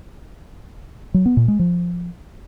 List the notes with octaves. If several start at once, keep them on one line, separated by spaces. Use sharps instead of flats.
F#3
B3
A#2
G#3
F3